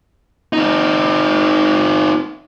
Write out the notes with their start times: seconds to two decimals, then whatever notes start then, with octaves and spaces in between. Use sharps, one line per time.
0.53 C4 D#4